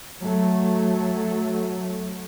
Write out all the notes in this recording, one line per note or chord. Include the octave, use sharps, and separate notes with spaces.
F#3 A3